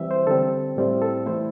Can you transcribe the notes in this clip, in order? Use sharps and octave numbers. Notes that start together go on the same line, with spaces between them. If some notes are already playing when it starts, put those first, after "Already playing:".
Already playing: E3 G3 C4 E5
C5
D3 G3 C4 A4
A2 G3 C4 E4
A4
E3 A3 E4 C5